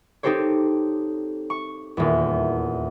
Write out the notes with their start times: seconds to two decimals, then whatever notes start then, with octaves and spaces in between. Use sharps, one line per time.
0.23 C4 D#4 G4 A4 C5 C#5
1.50 C#6
1.97 D#1 E2